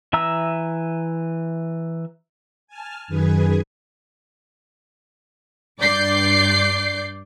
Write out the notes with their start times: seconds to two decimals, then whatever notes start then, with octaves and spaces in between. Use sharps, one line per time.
0.13 E3 E5 A#5 E6
2.67 G#5 A5 F6
3.08 F#2 D#3 G#4 B4 G#5
5.79 G2 D5 D6 G6 C7